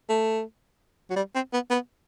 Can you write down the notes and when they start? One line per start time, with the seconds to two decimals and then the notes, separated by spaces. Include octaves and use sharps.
0.09 A3
1.10 F#3
1.16 G3
1.35 C4
1.53 B3
1.70 B3